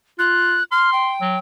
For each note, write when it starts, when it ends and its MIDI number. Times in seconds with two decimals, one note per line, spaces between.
0.19 0.57 65
0.19 0.63 90
0.72 1.12 84
0.72 0.90 89
0.93 1.39 79
1.21 1.38 54